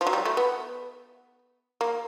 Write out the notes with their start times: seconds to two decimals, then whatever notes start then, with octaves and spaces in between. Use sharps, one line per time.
0.01 F3
0.07 F#3
0.13 G3
0.25 A3
0.37 B3
1.81 A#3